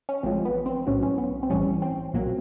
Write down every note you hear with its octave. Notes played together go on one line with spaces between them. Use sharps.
C#4
A1 A2 F3 G#3 C4
B3
C4
B1 A2 F#3 C#4
C#4
B3
C4
A#1 A2 E3 G3 C#4
C4
B1 A#2 F#3 A#3